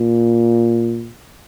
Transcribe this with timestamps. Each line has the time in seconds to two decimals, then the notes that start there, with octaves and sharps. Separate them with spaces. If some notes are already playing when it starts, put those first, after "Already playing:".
Already playing: A#2